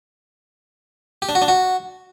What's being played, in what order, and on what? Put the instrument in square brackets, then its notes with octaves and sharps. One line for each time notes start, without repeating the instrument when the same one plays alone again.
[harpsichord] G4
D4
F#4
D4
F#4